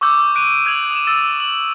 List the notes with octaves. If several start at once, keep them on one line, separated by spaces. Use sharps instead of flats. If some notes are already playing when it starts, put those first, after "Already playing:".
C#6 D6 E6 G6
D6 F#6 D7 D#7
D#6 G6 G#6 D7 F7 F#7
D#6 E7
E6 A6
F#7